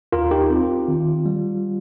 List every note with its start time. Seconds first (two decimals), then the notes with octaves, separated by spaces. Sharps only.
0.12 D#2 F4 A#4
0.31 D#4 G4
0.50 C4 F4
0.88 D#3
1.26 G3